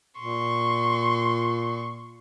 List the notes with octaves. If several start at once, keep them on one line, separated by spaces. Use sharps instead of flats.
A#2 C6 C#6